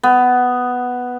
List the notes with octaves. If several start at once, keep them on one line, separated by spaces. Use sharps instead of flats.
B3